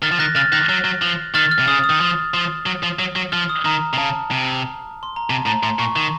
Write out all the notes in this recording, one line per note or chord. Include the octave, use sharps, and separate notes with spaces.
D#3 F6 A6
F3
D#3 F#6 A#6
C#3 F6 A6
D#3 F#6 A#6
F#3
F#3
F3
D#3 F6 A6
F6
C3
C#3 D#6
D#6
D#3
F3
F3
F#3
F3
F#3
F#3
F3 F6
D#6
D#3 A#5
C3
C#3 A5
C3
C6
A#5
C3 A5
A2 A#5
A2 C6
A#2 C#6
D#3